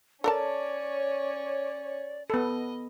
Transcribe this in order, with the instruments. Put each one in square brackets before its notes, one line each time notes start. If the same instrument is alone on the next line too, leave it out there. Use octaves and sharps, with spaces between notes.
[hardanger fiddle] C#4 C#5 [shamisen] A4 A#4 A5 [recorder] D5
[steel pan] B3 A4 [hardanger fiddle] D#5